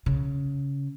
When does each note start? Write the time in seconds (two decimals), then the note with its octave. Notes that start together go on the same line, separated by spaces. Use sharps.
0.06 C#3